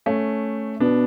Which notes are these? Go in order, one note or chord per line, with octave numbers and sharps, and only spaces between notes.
A3 C#4
B2 B3 D4